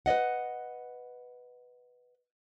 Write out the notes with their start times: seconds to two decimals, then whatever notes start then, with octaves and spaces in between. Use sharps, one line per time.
0.06 B4 D5 D#5 F#5